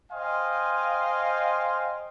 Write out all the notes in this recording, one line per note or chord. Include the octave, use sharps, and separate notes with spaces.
C5 D#5 F5 G5 G#5 C6